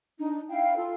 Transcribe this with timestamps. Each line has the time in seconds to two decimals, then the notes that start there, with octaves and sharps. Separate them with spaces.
0.18 D4 D#4
0.49 E4 F5 G5
0.76 F4 A4